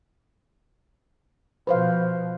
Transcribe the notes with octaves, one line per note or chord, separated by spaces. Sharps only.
B2 F3 B4 C5 F5